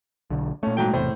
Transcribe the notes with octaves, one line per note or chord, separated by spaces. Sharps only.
B1 D3
A#2 A3 C#4
G#2 F#3 G5
E1 E2 A2 C3 C5